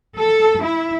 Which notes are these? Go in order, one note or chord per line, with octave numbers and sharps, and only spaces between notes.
A4
E4